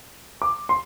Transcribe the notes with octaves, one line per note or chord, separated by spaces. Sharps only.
D6
C6